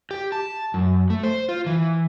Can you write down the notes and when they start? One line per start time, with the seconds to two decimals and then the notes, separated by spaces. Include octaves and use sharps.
0.11 G4
0.32 A5
0.74 F#2
1.10 A3
1.24 C5
1.49 F4
1.66 E3